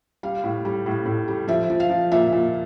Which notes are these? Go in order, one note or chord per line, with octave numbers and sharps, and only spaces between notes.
G3 F5
A2
G3
A2
A2
G3
F3 E5
F3
F5
F3
A#2 E5
A#2